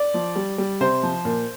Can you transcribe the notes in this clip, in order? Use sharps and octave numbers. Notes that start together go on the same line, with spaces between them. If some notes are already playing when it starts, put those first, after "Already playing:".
Already playing: D5
F3
G3
G3
C3 C5
F3
A#2